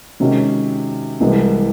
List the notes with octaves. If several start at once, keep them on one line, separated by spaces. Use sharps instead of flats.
C3 D#3 G#3 C#4 F#4
C2 C3 E3 G#3